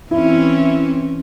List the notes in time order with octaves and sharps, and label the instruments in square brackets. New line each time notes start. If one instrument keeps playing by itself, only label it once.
[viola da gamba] E3 C4 C#4 [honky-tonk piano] E4